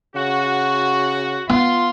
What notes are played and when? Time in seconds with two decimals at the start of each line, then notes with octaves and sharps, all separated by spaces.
0.15 C#3 F#4
1.49 B3 F4 C6